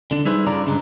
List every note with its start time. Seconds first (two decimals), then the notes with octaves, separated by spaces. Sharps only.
0.11 D3 D4
0.26 G3 D#4 E4 G#4 B4 C5
0.46 G2 C#3 D4 F4 D5 A#5
0.66 G2 C#3 G#3 D4